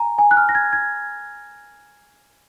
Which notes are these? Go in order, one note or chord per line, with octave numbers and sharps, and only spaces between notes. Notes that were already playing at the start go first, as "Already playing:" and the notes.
Already playing: G#5 A#5
G#5
F#6
F6
A#6
G#6
G#6